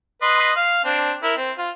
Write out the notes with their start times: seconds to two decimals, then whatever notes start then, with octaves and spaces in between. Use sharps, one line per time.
0.22 B4 D#5 C6
0.56 F5
0.85 C4 D4
1.23 E4 A#4
1.38 C4
1.58 F4